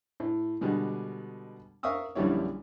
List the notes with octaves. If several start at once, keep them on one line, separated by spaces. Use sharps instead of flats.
A2
B2 D3 G3 G#3
A#4 E5 F5 C#6 D#6 E6
A#1 F#2 D3 G3 E4 C#5